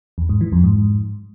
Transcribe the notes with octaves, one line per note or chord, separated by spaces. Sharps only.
E2
G#2
E3
F2
G#2